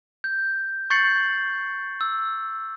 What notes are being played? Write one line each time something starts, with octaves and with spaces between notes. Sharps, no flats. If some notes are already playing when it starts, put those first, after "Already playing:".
G6
C#6 G6 A6 C7 C#7 F#7
E6